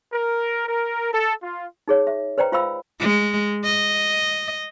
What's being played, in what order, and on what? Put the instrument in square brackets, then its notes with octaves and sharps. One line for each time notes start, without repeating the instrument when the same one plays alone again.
[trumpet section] A#4
A#4
A4
F4
[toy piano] D#4 G#4 C#5
E5
B4 C5 D5 G5 A#5
F4 C5 F5 G5 B5 E6
[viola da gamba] G#3
D#5